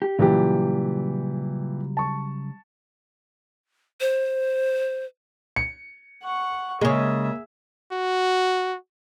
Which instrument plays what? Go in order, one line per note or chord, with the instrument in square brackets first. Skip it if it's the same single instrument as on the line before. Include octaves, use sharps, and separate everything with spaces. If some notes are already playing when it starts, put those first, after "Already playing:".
[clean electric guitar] G4
[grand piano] A#2 E3 G4 [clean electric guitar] C#3 F#3 G3
[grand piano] A5 C#6
[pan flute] C5
[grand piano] C#7
[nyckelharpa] F#5 C#6
[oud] C#3 G#3 [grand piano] A#3 [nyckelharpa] G#4 E5
[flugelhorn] F#4